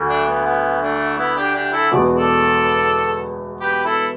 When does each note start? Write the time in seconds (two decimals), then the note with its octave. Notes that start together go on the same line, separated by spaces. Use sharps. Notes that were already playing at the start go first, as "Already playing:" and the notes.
Already playing: D2 D3
0.09 A3 D4
0.27 B3
0.45 B3
0.82 A3 D4
1.18 B3 E4
1.36 D4 G4
1.55 D4 G4
1.72 E4 A4
1.91 E1 E2 B2 B3 D5
2.15 A4 D5
3.60 G4 B4
3.85 E4 A4